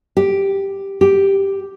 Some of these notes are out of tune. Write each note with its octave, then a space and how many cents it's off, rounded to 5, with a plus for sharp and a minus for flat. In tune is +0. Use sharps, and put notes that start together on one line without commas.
G4 +0
G4 +0